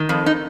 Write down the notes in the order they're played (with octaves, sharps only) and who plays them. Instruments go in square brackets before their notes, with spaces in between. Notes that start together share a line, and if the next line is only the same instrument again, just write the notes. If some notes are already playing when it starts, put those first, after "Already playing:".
Already playing: [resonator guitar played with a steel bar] D#3
F2
D#4